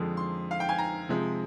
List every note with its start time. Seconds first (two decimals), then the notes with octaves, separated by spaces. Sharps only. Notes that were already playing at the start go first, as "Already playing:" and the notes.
Already playing: F2 D3 F3 G#3
0.17 C6
0.51 F5
0.60 G5
0.69 G#5
0.78 A#5
1.09 C3 F3 G#3